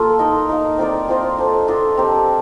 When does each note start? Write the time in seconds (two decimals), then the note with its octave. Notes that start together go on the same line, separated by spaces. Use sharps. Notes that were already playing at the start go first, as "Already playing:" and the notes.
Already playing: A#3 F4 A4
0.19 D#4 A#4 D#5
0.49 D#4 A#4 F5
0.78 C4 F4 A#4 D5
1.08 C4 F4 C5 D#5
1.38 D4 A4 C5
1.68 D4 F4 A4 D#5
1.97 C4 G4 A#4